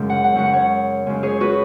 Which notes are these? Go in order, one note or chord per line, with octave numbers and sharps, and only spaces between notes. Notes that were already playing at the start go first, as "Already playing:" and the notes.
Already playing: F#2 C#3 G#3
F#5
F#5
F#2 C#3 G#3 F#5
C#5 F#5
F#2 C#3 G#3
G#4 C#5
F#4 B4